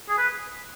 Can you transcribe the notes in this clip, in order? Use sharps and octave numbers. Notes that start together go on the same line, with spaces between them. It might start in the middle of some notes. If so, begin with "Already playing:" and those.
G#4
B4